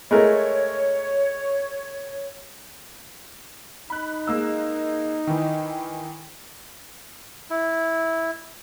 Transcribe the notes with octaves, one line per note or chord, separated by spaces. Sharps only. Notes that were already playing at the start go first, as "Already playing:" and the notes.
G#3 A3 A#4 C#5
D#4 B5 F#6
G#3 A#3 E6
D#3 E3
E4